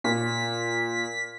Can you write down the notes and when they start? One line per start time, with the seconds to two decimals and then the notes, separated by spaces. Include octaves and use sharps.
0.04 A#2 B6